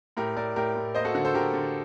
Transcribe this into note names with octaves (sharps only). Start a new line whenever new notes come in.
A2 G4 A#4
A2 A#4 D5
A2 G4 A#4
A2
A#3 C5 D#5
F#4 A4
D3 F#4
A4 C5
D3 G4 A#4
D3